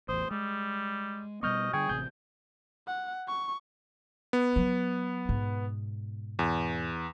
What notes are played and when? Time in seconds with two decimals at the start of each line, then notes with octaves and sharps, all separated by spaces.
0.09 A1 E2 C5 D#6
0.31 G3 G#3
1.43 B2 G3 B3 D#5 C#6 F6 G6
1.73 D3 G3 G#4 G5 C#6 G#6
1.89 A1 C3 G6
2.87 F#5
3.28 C#6
4.33 B3
4.56 F#3
5.29 G#2 B2
6.39 E2